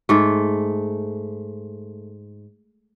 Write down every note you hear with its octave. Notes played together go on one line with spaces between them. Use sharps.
G#2 A3